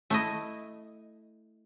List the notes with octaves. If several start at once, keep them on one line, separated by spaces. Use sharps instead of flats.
A3 E4 D#5